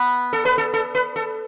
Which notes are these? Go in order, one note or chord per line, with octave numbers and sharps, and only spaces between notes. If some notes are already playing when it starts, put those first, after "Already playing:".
Already playing: B3
A4
B4
A4
A4
B4
A4